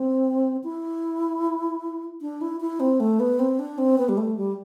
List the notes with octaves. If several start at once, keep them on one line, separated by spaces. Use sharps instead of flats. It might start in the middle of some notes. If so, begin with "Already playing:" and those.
Already playing: C4
E4
D4
E4
E4
C4
A3
B3
C4
D4
C4
B3
G3
A3
G3